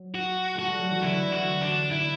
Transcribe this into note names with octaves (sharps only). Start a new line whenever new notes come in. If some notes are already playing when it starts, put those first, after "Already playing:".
Already playing: F#3
F#4
A3 F#4
G3
F#3
E3
D3 E4
F#4
D4
E4